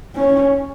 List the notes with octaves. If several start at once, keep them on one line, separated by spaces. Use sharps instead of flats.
C#4